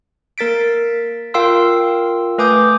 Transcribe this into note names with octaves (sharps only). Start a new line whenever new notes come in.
A#3 A#4 A6 B6 D7
F4 A#4 F5 G5 C6 E6
A3 B4 G#5 D6 D#6 G6